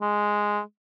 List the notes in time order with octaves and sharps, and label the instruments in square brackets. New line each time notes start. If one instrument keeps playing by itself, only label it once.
[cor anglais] G#3